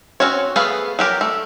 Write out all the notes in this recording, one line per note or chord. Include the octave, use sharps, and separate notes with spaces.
C4 C#4 F#4 C#5
A3 B3 G#4 B4 F5
F#3 G4 A#4
A3